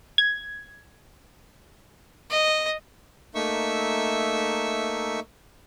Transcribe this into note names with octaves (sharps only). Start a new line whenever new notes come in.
G#6
D#5
A3 A#3 D#4 E5 C#6 E6